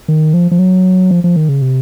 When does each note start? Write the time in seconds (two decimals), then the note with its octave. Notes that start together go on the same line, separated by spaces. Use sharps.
0.08 D#3
0.34 F3
0.51 F3
0.59 F#3
1.11 F3
1.24 F3
1.36 D#3
1.49 C#3
1.62 C3